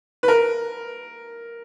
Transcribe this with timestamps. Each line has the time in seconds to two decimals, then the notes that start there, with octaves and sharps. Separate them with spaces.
0.23 B4
0.28 A#4